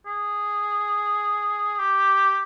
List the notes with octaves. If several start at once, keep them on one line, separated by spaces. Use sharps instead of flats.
G#4
G4